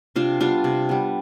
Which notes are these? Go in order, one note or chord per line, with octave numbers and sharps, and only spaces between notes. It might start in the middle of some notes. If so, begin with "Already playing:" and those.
C3 D4 F4
G3 B3 D4 F4
C3
G3 B3